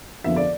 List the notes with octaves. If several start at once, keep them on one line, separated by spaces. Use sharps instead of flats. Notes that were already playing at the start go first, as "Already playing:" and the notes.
F2 D3 F3 B3 E5
D5